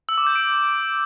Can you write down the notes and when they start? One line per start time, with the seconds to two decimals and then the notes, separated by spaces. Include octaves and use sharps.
0.09 E6
0.18 D6
0.27 G6
0.35 D7